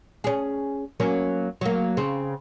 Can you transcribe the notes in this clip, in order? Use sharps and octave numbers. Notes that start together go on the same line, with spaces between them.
C#4 G#4
F#3 A#3 C#4
F#3 A#3
C#3 C4